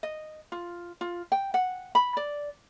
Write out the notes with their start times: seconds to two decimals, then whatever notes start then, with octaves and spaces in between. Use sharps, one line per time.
0.03 D#5
0.52 F4
1.01 F4
1.32 G5
1.54 F#5
1.95 B5
2.17 D5